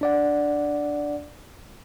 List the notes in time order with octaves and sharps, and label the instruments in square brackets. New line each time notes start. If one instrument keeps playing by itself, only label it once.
[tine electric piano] D4 D5 F#5